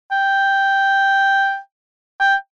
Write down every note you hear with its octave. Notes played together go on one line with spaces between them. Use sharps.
G5
G5